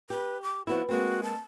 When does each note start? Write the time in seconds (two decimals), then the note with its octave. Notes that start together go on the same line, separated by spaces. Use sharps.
0.10 G4 B4
0.43 D6
0.67 F3 B3 E4 F#4
0.89 G#3 A#3 C4 F#4
1.23 A5